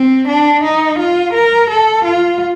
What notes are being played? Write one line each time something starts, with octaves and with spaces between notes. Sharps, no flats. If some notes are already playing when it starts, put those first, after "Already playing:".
Already playing: C4
D4
D#4
F4
A#4
A4
F4